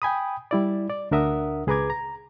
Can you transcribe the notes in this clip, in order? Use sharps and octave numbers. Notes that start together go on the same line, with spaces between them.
G5 G#5 B5 D#6
G3 E4 D5
D5
D2 D4 A#4 E5 F#5 D#6
C#2 G#4 B4 A#5 D6 G#6
A#5